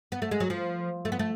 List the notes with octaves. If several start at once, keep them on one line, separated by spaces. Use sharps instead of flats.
B3
A3
G#3
F#3
F3
A3
B3
A3